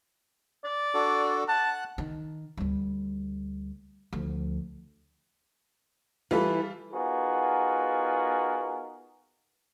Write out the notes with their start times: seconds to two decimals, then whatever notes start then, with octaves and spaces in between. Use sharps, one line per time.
0.64 D5
0.94 D4 F#4 A4
1.48 F#5 A5 F#6
1.98 D#3
2.57 D2 G3
4.13 D2 F3
6.31 E3 G3 E4 F4 A4
6.93 B3 D#4 F4 F#4 G#4 A#4